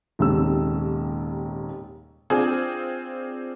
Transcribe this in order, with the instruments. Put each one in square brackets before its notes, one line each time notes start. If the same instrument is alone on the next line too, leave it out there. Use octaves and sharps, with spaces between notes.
[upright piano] D#1 D#2 G#2 C3 E6
[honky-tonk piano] C4 D4 F4 G#4